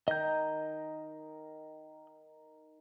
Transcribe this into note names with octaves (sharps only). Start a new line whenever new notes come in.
D#3 A#4 D#5 G6